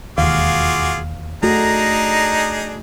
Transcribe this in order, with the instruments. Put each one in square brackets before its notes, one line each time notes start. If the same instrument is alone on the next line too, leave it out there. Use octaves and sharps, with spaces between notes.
[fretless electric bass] E1 D#2 [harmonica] F4 F#4 G#4 [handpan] F5 [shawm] D6
[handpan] A3 F#4 [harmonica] D4 D#4 G#4 [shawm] A#5